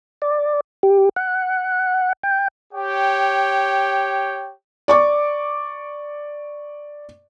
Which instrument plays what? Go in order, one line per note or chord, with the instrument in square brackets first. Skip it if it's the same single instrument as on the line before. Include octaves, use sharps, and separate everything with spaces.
[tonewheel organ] D5
G4
F#5
G5
[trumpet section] G4 C#5 G5
[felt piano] D5 C#6 D6